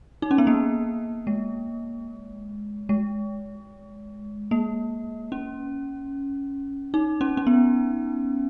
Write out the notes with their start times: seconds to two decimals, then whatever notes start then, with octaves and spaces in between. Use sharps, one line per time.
0.22 D#4
0.31 C#4
0.38 B3
0.47 A#3
1.27 G#3
2.89 G#3
4.51 A#3
5.32 C#4
6.94 D#4
7.21 C#4
7.37 C#4
7.47 B3